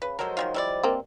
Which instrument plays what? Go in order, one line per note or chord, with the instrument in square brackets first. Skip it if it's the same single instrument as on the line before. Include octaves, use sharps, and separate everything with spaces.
[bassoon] C#3 [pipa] B4
[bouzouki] F3 G#3 C5 [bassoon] F#3 [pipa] A4 A#4
[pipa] D#3 G3 F4
[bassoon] G3 [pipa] E4 A#4 D5
[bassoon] G2 [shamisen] A#3 C4